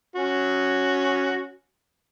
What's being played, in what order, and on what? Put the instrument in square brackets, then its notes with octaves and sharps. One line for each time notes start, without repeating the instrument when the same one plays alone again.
[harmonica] C#4 F#4